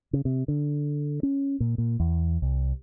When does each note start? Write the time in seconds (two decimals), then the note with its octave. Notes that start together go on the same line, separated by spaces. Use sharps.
0.13 C#3
0.25 C3
0.48 D3
1.23 C#4
1.60 A#2
1.78 A#2
2.00 E2
2.42 C2